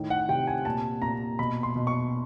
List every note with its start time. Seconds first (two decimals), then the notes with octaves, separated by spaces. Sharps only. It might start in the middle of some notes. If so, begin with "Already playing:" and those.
Already playing: A2 D#3
0.10 F#5
0.28 C3 G5
0.47 G#5
0.65 A#2 A5
1.02 A#2 A#5
1.39 B2 B5
1.63 C6
1.76 B2
1.87 C#6